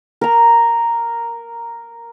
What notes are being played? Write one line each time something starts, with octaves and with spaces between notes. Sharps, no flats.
A#4 A#5